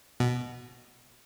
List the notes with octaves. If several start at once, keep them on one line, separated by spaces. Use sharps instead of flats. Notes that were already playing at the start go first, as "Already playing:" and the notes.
B2